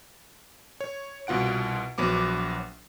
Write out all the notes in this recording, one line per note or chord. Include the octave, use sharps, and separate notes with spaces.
C#5
C2 B2 F4 F#5 D7
A#1 F#3 B3 D6